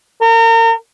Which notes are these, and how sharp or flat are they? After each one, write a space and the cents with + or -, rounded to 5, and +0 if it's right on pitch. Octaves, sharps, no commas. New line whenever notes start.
A#4 -35